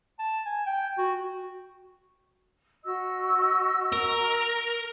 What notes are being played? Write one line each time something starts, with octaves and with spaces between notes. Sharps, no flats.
A5
G#5
G5
F#4
F#4 D#5 E6
A#4